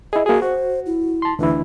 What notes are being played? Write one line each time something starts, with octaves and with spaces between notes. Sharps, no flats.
E4 G#4 D#5
A#3 F#4 G#4
F#4 C5
E4
A5 C6
D2 E3 D4 E4